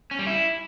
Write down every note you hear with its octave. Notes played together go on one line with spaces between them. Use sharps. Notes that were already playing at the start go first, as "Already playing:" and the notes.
C#4
G3
E4